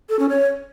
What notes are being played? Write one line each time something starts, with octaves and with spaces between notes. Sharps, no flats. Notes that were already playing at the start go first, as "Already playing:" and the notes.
A4
C#4
C#5